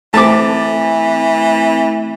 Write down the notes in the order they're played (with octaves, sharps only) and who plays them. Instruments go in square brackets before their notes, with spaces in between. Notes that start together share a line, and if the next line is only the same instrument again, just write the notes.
[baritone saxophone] E3 [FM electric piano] A3 C4 [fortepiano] A5 D6